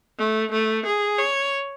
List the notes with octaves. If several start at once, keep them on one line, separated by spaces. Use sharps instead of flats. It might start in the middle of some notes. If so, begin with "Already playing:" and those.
A3
A3
G#4
C#5